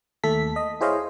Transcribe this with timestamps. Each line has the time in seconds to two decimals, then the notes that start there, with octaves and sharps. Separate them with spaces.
0.24 D#2 A3 A4 B6
0.56 D#5
0.81 E4 G#4 C5 C#5 D#5 F5